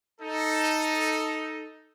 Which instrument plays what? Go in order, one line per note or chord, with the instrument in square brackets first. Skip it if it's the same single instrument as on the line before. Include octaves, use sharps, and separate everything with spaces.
[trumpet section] D#4 A4